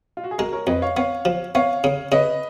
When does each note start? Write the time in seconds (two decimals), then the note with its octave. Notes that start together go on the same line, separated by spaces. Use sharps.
0.17 F4
0.24 F#4
0.31 G#4
0.38 G#3 F#4 A#4
0.53 A#4 C#5
0.67 F2 B4 D#5
0.82 C#5 F5
0.96 B3 C#5 F5
1.25 F3
1.55 B3 C#5 F5
1.84 C#3
2.12 C#3 B4 D#5